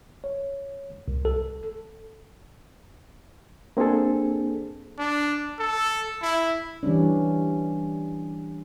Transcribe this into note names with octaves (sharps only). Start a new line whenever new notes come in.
C#5
C2
A4
A#3 C4 D4 G#4 A4
D4
A4
E4
E3 G3 C#4 D4